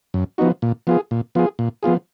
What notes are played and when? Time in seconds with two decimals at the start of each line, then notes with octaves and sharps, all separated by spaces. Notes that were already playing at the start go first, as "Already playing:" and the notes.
0.14 F#2
0.38 F3 B3 D#4 F#4
0.62 A#2
0.87 F3 B3 F4 G#4
1.11 A#2
1.35 F3 B3 F4 G#4
1.59 A#2
1.83 F3 B3 F4 G#4